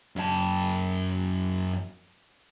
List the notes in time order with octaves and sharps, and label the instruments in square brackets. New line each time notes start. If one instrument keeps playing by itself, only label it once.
[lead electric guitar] F#2 A5